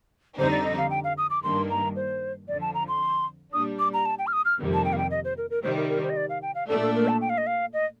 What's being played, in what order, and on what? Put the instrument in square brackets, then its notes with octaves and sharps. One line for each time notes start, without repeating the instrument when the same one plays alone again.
[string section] F2 D3 G3 C4 D#4 [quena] C5
[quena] D5
D#5
F5
G5
F5
D#6
D6
[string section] G2 D#3 A#3 D4 [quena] C6
[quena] A#5
C5
[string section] F2 D3 F3 [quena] D5
[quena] A5
A#5
C6
[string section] A#2 G3 D4 [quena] D#6
[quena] D6
A#5
A5
G5
F6
D#6
F6
[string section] F2 C3 D#3 G3 A#3
[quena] A5
G5
F5
G5
D#5
C5
A#4
A#4
[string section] C3 D#3 G3 [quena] C5
[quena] A#4
A#4
C5
D#5
D5
F5
G5
F5
[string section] A#2 A3 D4 [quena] A4
[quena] A4
A#4
A5
G5
F5
D#5
F5
D#5